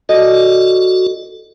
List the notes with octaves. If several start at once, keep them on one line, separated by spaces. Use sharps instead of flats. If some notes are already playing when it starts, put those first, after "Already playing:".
F#4 A4 D5 D#5